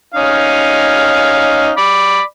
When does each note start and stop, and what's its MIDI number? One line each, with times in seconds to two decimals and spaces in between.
0.14 1.71 61
0.14 1.71 63
0.14 1.71 77
1.77 2.20 74
1.77 2.20 83